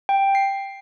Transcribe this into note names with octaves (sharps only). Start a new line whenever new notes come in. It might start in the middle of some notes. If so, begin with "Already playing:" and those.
G5
C7